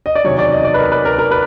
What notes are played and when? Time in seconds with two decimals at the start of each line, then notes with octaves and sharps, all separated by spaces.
0.06 D#5
0.15 D5
0.24 E2 C3 D#3 F#3 C#5
0.39 D5
0.52 D#5
0.65 D5
0.74 B4
0.78 A#4
0.92 B4
1.05 A#4
1.18 A#4
1.31 B4